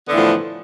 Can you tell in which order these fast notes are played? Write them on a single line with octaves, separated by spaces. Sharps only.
B3 D3 E3 A2 F3